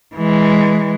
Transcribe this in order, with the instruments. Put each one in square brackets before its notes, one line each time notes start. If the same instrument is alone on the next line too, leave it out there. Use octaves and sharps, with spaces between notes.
[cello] E3 G#3